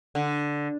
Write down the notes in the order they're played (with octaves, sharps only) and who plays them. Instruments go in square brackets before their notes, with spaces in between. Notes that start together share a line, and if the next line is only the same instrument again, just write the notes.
[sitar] D3